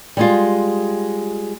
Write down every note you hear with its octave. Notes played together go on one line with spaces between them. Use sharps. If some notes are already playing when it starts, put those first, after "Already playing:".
G3 G#3 F4